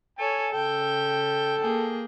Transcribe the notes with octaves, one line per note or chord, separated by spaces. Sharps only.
A4 C#5 G#5
C#3 A4 G5
A#3 G#4 G5